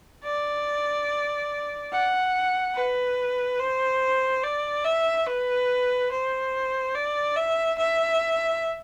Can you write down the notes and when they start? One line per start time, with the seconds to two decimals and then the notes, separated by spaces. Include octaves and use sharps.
0.24 D5
1.92 F#5
2.75 B4
3.59 C5
4.44 D5
4.85 E5
5.26 B4
6.11 C5
6.95 D5
7.36 E5
7.78 E5